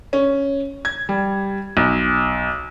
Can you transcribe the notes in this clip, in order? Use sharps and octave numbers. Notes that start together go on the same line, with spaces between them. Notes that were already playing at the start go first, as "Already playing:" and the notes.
C#4
G#6
G3
B1